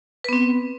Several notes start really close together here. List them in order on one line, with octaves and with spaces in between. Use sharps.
B4 B3 C4